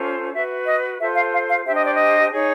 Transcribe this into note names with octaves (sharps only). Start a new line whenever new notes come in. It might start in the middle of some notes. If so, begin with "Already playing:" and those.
Already playing: C#4 F4 A4 C5
F#4 B4 E5
D#5
F4 A4 C5 E5
F5
F5
F5
D4 G4 C5 E5
D#5
D5
D#5
D#4 G#4 C#5